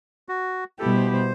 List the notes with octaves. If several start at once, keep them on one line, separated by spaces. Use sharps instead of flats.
F#4
B2 G3 B3 E4 G4 A4
C5
C5